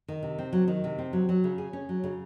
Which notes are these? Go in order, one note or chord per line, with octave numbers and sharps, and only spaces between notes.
D#3
C3
C4
F#3
D#3
C3
C4
F#3
F#3
C#3
G#4
C#4
F#3
C#3